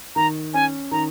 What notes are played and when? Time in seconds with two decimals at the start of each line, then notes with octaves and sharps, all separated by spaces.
0.16 D#3 A#5
0.54 C#4 G#5
0.91 D#3 A#5